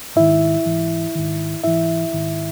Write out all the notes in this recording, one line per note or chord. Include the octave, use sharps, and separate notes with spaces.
G#2 D#3 E4 E5
G#2 E3
G#2 D#3
G#2 E3 E4 E5
G#2 D#3